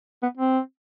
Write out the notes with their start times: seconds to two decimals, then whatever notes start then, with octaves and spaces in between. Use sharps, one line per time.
0.22 B3
0.37 C4